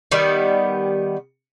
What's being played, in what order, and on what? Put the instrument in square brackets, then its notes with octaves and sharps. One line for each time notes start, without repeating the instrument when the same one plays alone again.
[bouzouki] D#3 G3 B3